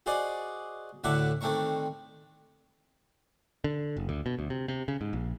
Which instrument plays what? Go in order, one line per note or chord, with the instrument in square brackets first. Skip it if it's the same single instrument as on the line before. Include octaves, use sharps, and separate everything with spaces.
[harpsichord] F#4 G#4 C5 D5 D#5
D2 A2 D3 E5 F#5 D6
D#3 A3 C4 D4 A#5 C#6
[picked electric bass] D3
F#1
D2
B2
D2
C3
C3
C#3
G#2
A#1